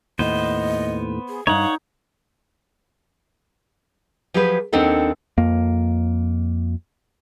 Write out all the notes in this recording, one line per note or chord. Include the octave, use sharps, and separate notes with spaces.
D#2 A2 B3 C5 D#5
G#4
D2 G2 D#4 C#5 F5 F#5
F3 F#3 G4 G#4 B4 C5
D#2 C4 D4 D#4 A4 F#5
F2 A#3